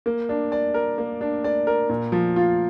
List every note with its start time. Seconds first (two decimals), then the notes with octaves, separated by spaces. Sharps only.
0.06 A#3
0.29 D4
0.52 D5
0.74 A#4
0.98 A#3
1.21 D4
1.44 D5
1.67 A#4
1.89 A#2
2.12 F3
2.36 F4